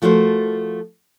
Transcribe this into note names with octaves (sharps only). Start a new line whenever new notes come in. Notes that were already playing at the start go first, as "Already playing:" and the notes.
F3 A3 F#4 A#4 C5